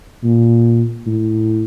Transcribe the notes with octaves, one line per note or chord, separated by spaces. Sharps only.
A#2
A2